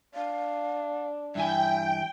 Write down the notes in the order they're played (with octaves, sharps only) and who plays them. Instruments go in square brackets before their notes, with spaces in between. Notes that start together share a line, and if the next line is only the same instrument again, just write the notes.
[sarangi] D4 [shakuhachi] F5
[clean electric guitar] G2 E3 G#5 [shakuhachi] E5 [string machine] G5